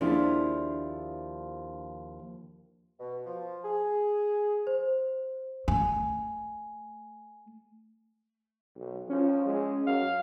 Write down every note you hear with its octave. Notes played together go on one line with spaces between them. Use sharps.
D#2 F3 D4 E4 G#4
B2
F3
G#4
C5
A3 G#5
B1
F3 C#4
G#3
F#2 F5